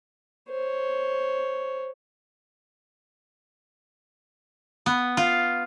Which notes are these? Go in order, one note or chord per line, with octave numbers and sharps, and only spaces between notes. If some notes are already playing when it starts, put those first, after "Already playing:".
C5 C#5
B3
F4